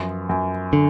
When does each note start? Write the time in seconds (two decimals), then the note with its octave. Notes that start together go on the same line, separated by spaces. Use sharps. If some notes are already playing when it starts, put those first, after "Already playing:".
Already playing: F#2 F3 B3
0.29 F#2
0.73 D3